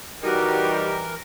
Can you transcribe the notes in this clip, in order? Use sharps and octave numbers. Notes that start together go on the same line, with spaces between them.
E3 G3 D#4 F#4 G4 A#4